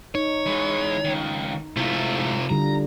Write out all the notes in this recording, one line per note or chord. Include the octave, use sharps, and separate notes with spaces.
D#4 C#5
E3 G#3
C#2 D#3
G#2 C3 A3 E4 F4
D3 G3 F4 A#5